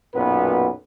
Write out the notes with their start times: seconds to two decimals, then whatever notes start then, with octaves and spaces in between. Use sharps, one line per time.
0.15 B1 F#2 A#2 B3 B4